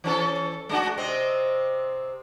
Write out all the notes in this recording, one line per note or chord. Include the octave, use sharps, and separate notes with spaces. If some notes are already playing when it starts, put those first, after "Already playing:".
E3 C#4 A4
G#3 D4 F#4
C3 C4 D#5